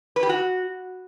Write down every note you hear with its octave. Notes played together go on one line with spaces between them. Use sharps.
B4
G4
F#4